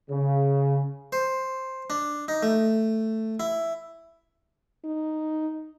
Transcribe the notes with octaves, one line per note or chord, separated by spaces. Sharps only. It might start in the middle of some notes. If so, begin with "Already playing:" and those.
C#3
C5
D4
D#4
A3
E4
D#4